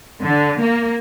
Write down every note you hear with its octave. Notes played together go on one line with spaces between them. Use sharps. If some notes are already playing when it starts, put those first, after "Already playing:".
D3
A#3